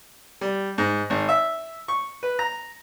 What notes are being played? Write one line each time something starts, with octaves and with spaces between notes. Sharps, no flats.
G3
G#2
G#1
E5
C#6
B4
A#5